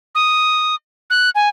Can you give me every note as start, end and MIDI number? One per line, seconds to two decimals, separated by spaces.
0.15 0.75 87
1.10 1.30 90
1.35 1.49 80